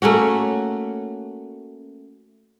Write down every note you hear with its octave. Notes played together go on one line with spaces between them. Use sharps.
A3 A#3 C#4 F#4